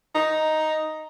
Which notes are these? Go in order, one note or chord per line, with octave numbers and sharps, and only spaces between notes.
D#4